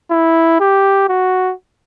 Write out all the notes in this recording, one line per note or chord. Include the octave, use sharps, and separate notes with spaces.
E4
G4
F#4